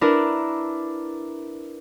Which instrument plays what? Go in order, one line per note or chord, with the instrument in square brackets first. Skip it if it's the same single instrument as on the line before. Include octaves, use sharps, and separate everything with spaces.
[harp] D4 E4 A#4 B4